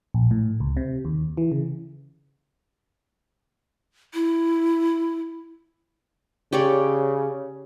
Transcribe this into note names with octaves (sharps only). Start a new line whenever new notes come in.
A#1
A2
C#2
C3
D#2
E3
C#3
E4
C#3 G4 C#5 D5